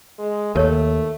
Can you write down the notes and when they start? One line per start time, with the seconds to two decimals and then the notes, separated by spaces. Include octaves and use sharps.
0.19 G#3
0.55 D#2 A3 A#4 C#5